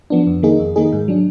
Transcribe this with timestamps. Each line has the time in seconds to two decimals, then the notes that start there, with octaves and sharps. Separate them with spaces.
0.10 F3 B3 D4
0.27 F2
0.43 D#3 A#3 D#4 G#4
0.59 F2
0.76 D#3 A#3 D#4 G#4
0.93 G#2
1.08 F#3 D4